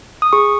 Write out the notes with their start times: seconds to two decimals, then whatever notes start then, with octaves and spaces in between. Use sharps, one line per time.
0.22 D#6
0.33 G#4 C#6